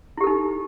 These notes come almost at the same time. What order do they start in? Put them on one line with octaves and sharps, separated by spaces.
E4 G4 A4 D#4